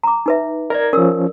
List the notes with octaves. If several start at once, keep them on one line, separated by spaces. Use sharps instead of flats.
A#5 D6
D#4 B4 E5
A#4 D5 D#5 A#5 G#6
F3 C#4 A#4 E6